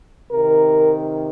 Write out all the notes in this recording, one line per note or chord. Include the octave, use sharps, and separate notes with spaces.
C3 D#3 A#4